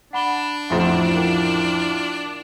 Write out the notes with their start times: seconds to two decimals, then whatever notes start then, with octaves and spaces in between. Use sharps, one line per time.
0.13 D4 F#5 B5 G7
0.70 A1 F2 E4 F4 E5 F#5
1.15 A#4 G5